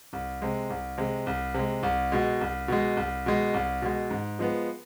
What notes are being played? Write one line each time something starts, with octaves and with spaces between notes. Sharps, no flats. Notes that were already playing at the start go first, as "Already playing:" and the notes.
C2
C3 G#3
C2
C3 G#3
C2
C3 G#3
C2
B2 G#3
C2
B2 G#3
C2
B2 G#3
C2
B2 G#3
G#2
F3 G#3 B3